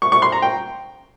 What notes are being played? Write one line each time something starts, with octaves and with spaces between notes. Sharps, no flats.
C#6
C#6
C6
A#5
G5